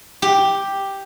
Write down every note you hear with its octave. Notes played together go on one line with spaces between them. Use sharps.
G4